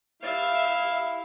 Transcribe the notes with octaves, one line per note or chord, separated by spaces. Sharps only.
E4 G4 E5 F5